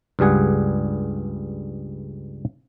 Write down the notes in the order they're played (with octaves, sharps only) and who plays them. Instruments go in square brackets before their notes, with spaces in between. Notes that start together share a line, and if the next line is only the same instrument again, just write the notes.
[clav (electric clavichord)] C#2 G2 G3 G#4 F#5